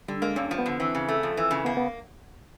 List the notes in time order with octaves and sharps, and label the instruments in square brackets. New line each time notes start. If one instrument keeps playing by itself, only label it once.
[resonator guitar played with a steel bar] D3 [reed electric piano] G3
[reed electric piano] G#3 [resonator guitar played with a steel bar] A#3
[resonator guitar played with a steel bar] G2 [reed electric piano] C#4
[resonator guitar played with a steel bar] F3
[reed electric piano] B3
[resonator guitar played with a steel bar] D3
[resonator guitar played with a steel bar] E3 [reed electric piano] C4
[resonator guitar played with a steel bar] C#3
A3
F2
E3
C#3
[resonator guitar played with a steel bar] A#3 [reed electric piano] B3
[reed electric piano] B3